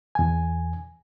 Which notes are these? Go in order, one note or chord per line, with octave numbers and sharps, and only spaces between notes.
E2 G#5